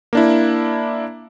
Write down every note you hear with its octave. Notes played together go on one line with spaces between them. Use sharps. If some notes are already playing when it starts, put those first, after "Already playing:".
A#3 D4 E4